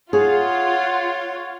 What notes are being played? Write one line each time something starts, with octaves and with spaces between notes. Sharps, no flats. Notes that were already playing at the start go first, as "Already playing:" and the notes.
F4 G#4 C#5 F#5